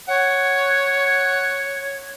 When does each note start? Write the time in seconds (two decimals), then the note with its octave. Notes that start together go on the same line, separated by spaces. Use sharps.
0.08 C#5 F#5